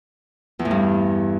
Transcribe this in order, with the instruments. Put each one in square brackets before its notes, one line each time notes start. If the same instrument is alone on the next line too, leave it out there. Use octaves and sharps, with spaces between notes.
[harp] E2
A2
G2